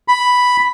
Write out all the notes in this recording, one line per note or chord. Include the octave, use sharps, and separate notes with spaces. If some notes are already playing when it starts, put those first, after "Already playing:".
B5